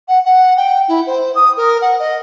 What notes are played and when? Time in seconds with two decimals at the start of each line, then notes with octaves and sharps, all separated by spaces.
0.08 F#5
0.25 F#5
0.57 G5
0.88 E4
1.06 C5
1.35 D#6
1.57 A#4
1.81 F#5
1.99 D#5